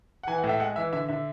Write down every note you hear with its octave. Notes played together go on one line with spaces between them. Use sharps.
F#5
E3 G#5
F#5
A2
E5
G#3 F#5
E3 E5
D3 E5
D3 E5